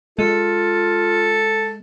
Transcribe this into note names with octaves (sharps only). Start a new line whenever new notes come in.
G#3 F4 A4